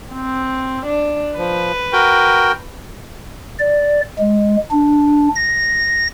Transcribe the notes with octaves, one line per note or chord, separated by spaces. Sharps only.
C4
D4
F3 B4
F#4 A#4 G5
D5
G#3
D4
A#6